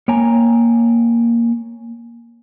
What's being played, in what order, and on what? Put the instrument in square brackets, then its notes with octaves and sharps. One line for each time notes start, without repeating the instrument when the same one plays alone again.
[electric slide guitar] A#3 C#5 G5 G#5 A#5